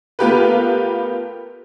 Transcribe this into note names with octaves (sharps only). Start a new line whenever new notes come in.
A3 B3 F4 G4 A#4 B4